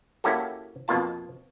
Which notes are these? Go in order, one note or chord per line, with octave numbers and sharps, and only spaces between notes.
A#3 C#4 E4 F#4 G4 A4
F2 B2 A#3 F4 A5